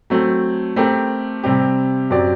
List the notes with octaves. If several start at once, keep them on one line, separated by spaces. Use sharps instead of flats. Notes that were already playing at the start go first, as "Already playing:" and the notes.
F#3 A3 C4
A3 C4 G4 A#4
C3 G3 C4 G4
F#2 F#3 C4 G4 D5